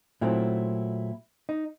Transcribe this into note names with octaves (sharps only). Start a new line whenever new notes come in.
A#2 F#3 A3 C4 E4
D#4